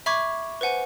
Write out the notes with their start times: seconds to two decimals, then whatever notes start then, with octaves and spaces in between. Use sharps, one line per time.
0.06 E5 B5 C#6 D6 G#6
0.61 B4 C5 F#5 G#5